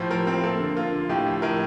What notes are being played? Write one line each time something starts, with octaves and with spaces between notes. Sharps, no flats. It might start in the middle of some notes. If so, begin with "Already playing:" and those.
Already playing: A2 F3 C5
F3 A#4
C4
A#3 A4
D3
A#3 F4
D3
A2 G4
F3
A2 A#4